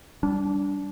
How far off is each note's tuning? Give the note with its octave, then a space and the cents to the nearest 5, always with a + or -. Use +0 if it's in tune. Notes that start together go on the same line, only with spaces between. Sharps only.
G3 +0 D4 -25